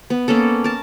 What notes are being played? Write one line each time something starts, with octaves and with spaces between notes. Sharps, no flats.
B3
A#3 B3 C#4 A4
A#4 A5